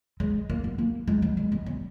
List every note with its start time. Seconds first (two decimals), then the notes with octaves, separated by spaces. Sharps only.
0.20 G#3
0.50 A#3
0.64 B3
0.78 A#3
1.08 G#3
1.22 G3
1.37 G#3
1.52 B3
1.66 G3